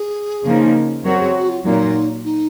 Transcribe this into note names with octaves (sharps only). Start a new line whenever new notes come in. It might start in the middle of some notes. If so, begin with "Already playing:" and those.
Already playing: G#4
C#3 F3 A#3 D#4
F#3 C4 F#4 A#4 C#5
G#4
F#4
F4
A#2 F#3 A#3 D#4
D#4